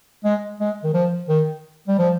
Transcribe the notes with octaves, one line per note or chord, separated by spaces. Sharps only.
G#3
G#3
D#3
F3
D#3
G3
F3